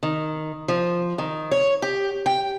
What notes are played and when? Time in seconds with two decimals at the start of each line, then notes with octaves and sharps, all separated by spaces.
0.03 D#3
0.68 F3
1.18 D#3
1.51 C#5
1.82 G4
2.26 G5